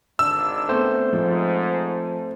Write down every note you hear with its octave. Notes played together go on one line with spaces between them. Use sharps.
G#1 D3 D4 E6
A3 B3 C4 C5
G#2 F3